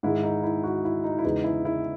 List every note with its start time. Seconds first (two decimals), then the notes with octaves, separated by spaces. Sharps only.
0.03 G#2 D#3 G#3 E4
0.23 D#4
0.43 E4
0.63 F#4
0.85 E4
1.04 D#4
1.19 E4
1.24 E2 C#3 E3 G#3 D#4
1.44 E4
1.65 E4